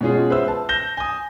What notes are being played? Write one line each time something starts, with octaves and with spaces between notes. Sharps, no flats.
B2 G#3 C#4 F4 G#4
B4 C5 E5 E6
A5
G6 A#6 E7 G7
G#5 D#6